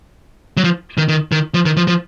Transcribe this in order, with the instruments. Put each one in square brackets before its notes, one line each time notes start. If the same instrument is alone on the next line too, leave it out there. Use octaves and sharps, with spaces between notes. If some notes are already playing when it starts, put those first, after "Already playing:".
[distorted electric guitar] F#3
F3
D#3
D#3
D#3
F3
D#3
F3
F3